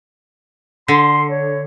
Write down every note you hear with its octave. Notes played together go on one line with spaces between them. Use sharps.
D3 C6
C#5